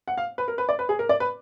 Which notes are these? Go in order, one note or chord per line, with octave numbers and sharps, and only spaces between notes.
F#5
F5
B4
A#4
B4
D5
B4
G#4
A#4
D5
B4